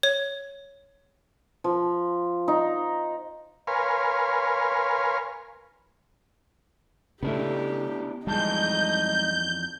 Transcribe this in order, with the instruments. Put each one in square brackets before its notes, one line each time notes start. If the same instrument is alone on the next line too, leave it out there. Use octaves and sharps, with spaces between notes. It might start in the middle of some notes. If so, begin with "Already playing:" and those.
[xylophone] C#5
[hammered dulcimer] F3
D#4
[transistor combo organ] A#4 B4 C#5 F5 G#5 C6
[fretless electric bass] C#3 A3 [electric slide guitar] B3 D4 E4 [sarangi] G4
[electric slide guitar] F2 E3 A5 [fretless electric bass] G3 G#3 [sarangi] D#4 [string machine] G6